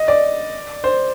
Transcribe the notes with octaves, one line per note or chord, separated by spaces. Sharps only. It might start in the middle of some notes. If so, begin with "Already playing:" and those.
Already playing: D#5
D5
C5